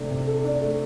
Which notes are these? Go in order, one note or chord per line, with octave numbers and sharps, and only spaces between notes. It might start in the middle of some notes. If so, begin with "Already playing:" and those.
Already playing: C3 A3 D4
C3
A4
D4
A3